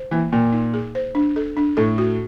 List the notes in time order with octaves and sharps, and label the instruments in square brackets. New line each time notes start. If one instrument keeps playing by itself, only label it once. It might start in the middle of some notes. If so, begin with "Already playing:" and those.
Already playing: [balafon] C5
[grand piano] E3 [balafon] A#3
[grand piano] A#2 [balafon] A#3
[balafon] D#4
G#4
C5
D4
A4
D4
[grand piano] A2 [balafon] A4
[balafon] F#4